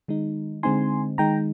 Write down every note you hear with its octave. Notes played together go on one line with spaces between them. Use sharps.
D#3 G#3 D#4
D3 G#3 C4 D#4 G#5 C6
D#3 G#3 D#4 G5 A#5